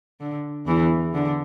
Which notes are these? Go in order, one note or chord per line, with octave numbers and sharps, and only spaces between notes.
D3
E2 E3
D3